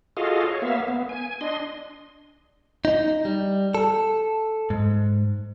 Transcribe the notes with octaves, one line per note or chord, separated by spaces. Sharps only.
F4 F#4 G#4 A4 D#5 F5
C#5
A#3 B3 E5 F5
B3
G#5
D4 D#5 C6
D#4
G3
A4
G#2